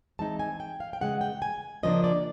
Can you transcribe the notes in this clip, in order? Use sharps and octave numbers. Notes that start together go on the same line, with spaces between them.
E3 G#3 C4 D#4 A5
G#5
G5
F5
G5
C#3 E3 G#3 F#5
G5
G#5
C#3 F3 A#3 D4 D#5
D5